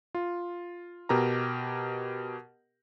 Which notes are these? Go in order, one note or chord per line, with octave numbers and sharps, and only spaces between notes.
F4
B2 G4 A#4 A#5